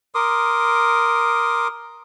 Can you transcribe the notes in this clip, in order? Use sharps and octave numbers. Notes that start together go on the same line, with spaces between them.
A#4 C6 D6 D#6